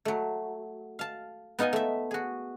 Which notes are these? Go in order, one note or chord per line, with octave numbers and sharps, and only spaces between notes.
F#3 A3
F5 A5
B3 D#4 F4 D#5 G#5
A3 E5
F#4 G#4